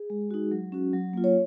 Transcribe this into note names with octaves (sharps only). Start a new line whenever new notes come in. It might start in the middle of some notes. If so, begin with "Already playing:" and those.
Already playing: G#4
G#3
D#4 F#4
F#3
C#4 F#4
F#3
A#3 F4
C#5